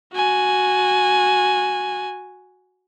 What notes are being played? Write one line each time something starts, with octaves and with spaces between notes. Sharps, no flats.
F#4 G#5